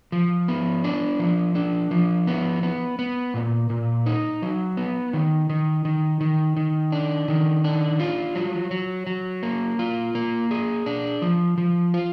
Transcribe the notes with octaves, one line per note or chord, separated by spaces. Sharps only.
F3
B3
D4
F3
D4
F3
B3
B3
B3
A#2
A#2
D#4
F#3
B3
D#3
D#3
D#3
D#3
D#3
D4
D#3
D4
F4
F#3
F#3
F#3
A#3
F4
A#3
G#4
D4
F3
F3
F4